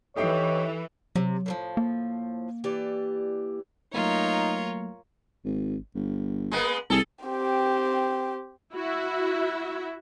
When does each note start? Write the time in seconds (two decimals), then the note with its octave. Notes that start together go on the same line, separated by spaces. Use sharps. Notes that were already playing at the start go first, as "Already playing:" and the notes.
0.16 E3 D#4 G4 A4 C#5 E5 G5
1.16 C3 F#3
1.46 A2 D#3 F3
1.77 A#3
2.64 E3 G4 D5
3.94 F#3 A3 A#3 D#4 F4 A#4 C#5
5.45 G#1
5.95 G1
6.52 G#3 A#3 B3
6.90 C2 G#4 A4
7.25 C4 G4
8.73 E4 F#4 E5